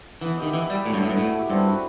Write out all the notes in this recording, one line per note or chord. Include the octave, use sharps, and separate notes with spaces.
E3 B3
D#3 E4 G4 D#5
E3 E4
G3 B4 E5
A2 F#3
G2
A2 B3 E4
G2
A2 A3
E4 G4
G2 C4
F#4 B4